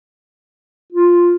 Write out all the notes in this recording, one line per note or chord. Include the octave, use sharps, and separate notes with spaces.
F4